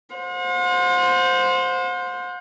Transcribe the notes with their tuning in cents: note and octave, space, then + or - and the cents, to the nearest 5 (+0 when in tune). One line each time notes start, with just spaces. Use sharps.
C5 +0 F#5 -45